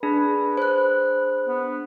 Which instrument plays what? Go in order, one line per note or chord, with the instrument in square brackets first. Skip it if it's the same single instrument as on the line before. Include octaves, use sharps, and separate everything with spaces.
[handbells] D4 G#4 [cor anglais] B4
[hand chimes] C5 F#6
[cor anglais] B3